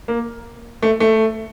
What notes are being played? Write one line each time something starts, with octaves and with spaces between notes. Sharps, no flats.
A#3
A3
A3